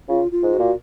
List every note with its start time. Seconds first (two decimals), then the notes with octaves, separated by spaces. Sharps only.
0.09 C#3 F4
0.32 F4
0.43 G#2
0.54 F#4
0.59 A#2